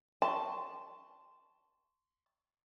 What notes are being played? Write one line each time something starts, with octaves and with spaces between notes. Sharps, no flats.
A5 C6 C#6